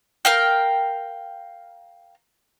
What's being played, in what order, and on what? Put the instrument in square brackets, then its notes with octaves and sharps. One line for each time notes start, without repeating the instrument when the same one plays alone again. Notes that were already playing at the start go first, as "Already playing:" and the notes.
[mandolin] A#4 F5 G5